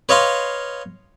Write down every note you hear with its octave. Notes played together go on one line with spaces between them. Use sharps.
B4 C#5 D#5 F5 C6